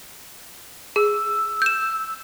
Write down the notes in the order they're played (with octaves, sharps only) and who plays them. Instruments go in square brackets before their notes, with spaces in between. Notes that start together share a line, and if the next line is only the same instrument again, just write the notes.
[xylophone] G#4 [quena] E6
[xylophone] G6 E7